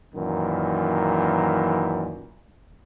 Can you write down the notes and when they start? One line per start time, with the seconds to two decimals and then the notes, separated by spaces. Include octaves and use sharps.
0.15 F#2 A#2 D#3 E3